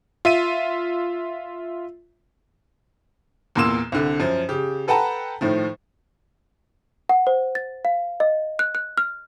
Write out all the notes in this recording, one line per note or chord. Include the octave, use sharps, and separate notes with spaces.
F4 E5 D#7
E2 A#2 A#3 C6 E6 E7
C2 D3
F#2 F3
C#3 G4
A4 B4 F#5 G5 A5 A#5
A2 D#3 F3
F#5
C5
A6
F5
D#5
F#6
F#6
F6